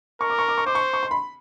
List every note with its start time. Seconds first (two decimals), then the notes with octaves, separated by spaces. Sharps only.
0.21 A#4 C#6
0.30 D6
0.39 C#6
0.48 D6
0.58 C#6
0.66 C5 D6
0.75 C#6
0.93 C#6
1.03 C6
1.11 B5